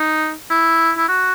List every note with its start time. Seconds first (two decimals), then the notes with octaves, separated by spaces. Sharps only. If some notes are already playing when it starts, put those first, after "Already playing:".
Already playing: D#4
0.50 E4
0.98 E4
1.08 F#4